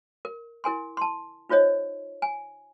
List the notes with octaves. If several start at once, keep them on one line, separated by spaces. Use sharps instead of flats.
A#4
E4 A#4 G#5 C6
A5 C6
D#4 F4 C5 C#5 D#5
G#5